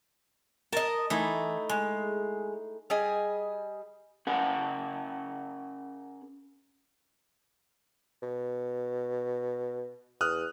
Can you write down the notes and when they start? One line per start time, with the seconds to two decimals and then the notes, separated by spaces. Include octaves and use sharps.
0.73 A#4 D#5 A5
1.10 E3 A3 D#4 E4
1.69 G#3
2.90 G3 G#4 D#5 G#5
4.27 C#4 G#4 A#4 F#5
8.22 B2
10.21 E2 D#6 F6 F#6